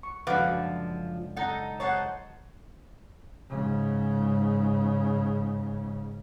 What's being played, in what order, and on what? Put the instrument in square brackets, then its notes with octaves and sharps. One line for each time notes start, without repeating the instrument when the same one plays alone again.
[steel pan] C#6
[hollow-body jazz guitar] C#2 F#2 D3 [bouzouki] F3 [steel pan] B4 F#5 D6
[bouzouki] D#4 A4 [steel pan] F#5 A#5
[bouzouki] D#4 C5 A5 [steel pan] C#5 F#5
[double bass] G#2 C#3